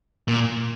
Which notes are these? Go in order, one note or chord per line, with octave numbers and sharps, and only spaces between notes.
A#2